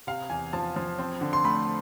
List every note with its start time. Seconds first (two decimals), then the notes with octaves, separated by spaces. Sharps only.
0.07 C3 F5
0.30 E2 G#5
0.53 F3 A5
0.76 F3
0.99 C4
1.21 D3
1.33 C6
1.44 A3 B5